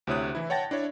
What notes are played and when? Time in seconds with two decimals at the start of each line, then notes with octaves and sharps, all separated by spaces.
0.07 D2 C3 E4 C#5 D#6 F#6
0.35 E3 E4
0.50 C#5 F#5 G5 A5 A6 A#6
0.71 D4 E4 C#5